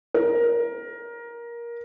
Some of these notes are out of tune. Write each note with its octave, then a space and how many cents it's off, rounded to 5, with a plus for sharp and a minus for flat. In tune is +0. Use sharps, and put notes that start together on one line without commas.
A#4 +15